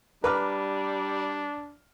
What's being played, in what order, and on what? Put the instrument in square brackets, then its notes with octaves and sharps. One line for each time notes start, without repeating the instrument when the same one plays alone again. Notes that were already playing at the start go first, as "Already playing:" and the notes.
[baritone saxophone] G3 [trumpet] D4 [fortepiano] B4 [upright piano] A#5 D6 F6